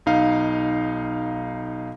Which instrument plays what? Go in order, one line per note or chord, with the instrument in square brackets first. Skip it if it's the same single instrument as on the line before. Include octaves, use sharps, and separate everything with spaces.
[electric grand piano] B1 D#4 F5